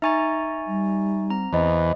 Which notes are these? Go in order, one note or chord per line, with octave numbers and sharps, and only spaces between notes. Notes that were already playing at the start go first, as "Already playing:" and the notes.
D#4 E5 G#5 A#5 C#6 A6
G3
C4 A#5
E2 C5 D#5